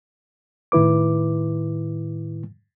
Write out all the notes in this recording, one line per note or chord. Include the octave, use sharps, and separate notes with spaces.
A2 D#3 E4 B4 D6